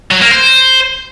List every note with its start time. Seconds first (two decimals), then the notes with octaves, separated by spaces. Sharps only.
0.11 F#3
0.21 A#3
0.31 C5